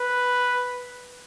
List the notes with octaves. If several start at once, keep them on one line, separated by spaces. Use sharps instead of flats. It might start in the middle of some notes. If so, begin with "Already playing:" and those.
Already playing: B4